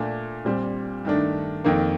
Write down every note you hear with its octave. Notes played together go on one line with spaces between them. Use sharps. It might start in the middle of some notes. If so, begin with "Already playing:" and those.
Already playing: A#2 A3 D4
A#2 G3 C4
G2 D#3 A3 D4
F2 D#3 A#3